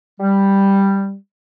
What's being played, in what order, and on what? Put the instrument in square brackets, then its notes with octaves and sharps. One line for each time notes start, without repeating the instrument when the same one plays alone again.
[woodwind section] G3